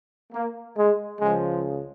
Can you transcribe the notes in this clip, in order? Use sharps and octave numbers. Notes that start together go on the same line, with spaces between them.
A#3
G#3
C#2 C#3 F3 G#3